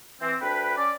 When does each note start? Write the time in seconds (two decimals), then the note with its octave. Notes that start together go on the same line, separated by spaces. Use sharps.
0.21 E3 C4
0.41 D2 D4 B4 G5 B5
0.77 C#4 D5